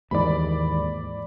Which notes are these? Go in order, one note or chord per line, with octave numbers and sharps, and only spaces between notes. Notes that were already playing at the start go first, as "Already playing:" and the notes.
D#2 G#2 E3 D5 B5